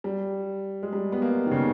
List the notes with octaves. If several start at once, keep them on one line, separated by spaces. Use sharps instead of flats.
G3
G#3
G3
B3
A#3
D#3
C#3